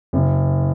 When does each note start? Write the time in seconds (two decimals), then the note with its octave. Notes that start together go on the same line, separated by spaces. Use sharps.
0.13 F#1